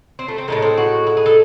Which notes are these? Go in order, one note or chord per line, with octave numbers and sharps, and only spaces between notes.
C4
A3
C4
A2 E3 G#3 A3
C4
F#4
E4
G#4
A4